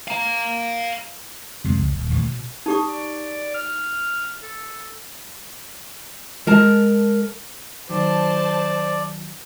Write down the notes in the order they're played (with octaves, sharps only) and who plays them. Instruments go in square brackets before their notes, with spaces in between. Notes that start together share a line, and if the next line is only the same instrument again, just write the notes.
[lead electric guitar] F5 A#5
[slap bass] F2 C3 G#3
C#2
D#1
D#1 A1 F2 E3
B2
[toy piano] D#4 G4 C#6 [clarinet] D#6
[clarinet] D5
F6
A4
[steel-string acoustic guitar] G#3 A#4 A5
[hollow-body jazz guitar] D#3 F#3 [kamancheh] C5 A5 [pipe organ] D5